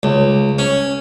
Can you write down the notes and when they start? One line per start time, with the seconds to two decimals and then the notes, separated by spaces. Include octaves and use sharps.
0.03 C#2
0.59 C#4